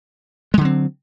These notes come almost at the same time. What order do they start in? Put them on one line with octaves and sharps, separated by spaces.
G#3 D3 F#3 C4